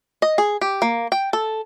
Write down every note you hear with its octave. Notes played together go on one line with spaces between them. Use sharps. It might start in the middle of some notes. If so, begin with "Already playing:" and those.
D#5
G#4
G4
A#3
G5
A4